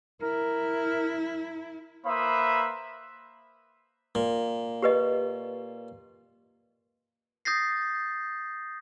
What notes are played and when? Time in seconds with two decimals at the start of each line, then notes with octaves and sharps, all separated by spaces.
0.22 E4 A#4
2.06 A#3 B4 C5 E5 B5 D#6
4.15 A#2
4.82 G4 B4 D#5
7.45 D#6 G6 A6 A#6 C7